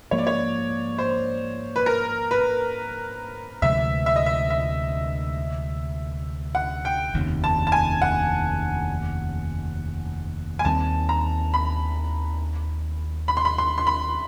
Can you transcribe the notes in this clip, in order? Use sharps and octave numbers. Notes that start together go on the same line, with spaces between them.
G#2 F3 A#3 C#5
D5
C#5
C5
B4
A#4
B4
D2 C3 F3 G#3 E5
E5
D#5
E5
E5
F#5
G5
F1 D#2 C#3
A5
A5
G#5
F#5
G#5
D#2 D#3 G3 C4 A5
A#5
B5
B5
C6
B5
C6
C6
B5